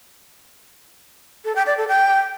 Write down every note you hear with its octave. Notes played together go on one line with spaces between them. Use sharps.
A4
G5
D5
A4
G5